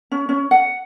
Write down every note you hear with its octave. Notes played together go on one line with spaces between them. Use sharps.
C#4
C#4
F#5